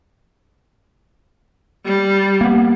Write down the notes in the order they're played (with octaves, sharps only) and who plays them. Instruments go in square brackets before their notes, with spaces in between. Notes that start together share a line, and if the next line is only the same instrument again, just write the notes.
[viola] G3
[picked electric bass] A#3 B3